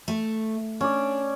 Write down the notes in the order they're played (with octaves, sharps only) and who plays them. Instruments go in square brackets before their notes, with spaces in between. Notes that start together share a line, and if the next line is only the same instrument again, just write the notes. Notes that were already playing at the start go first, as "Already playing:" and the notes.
[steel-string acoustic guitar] A3
[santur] C#4 D5 [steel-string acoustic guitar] D4